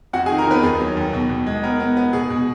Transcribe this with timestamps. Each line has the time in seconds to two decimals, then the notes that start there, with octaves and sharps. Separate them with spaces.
0.13 F2 F#4 F#5
0.26 G#4 G#5
0.31 D#3
0.38 A#4 A#5
0.47 D#3 B3 B4
0.63 D#2 G#4
0.80 F#3
0.97 D#2
1.13 B2
1.29 B2
1.46 G#3
1.63 B3 A#4
1.80 B3
1.97 B3
2.13 B2 G#4
2.30 B2